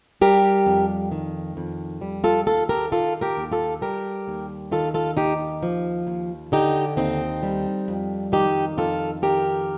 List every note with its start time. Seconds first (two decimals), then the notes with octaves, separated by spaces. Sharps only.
0.21 G3 G4 A#4
0.66 F2
1.12 D#3
1.57 F2
2.01 G3
2.24 F4 A4
2.47 D#2 F4 A4
2.69 G4 A#4
2.92 D#3 F4 A4
3.21 G4 A#4
3.37 D#2
3.52 F4 A4
3.81 G3 G4 A#4
4.28 D#2
4.72 D#3 F4 A4
4.94 F4 A4
5.17 D#2 D#4 G4
5.63 F3
6.07 D#2
6.52 D3 D#4 G4
6.97 D#2 C4 D#4
7.43 G3
7.88 F2
8.32 D#3 D#4 G4
8.77 F2 F4 A4
9.22 D#3 G4 A#4